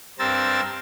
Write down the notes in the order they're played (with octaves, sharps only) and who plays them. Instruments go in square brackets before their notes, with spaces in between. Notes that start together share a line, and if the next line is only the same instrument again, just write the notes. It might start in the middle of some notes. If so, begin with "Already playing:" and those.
[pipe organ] G2 C4 A#4 E6 A6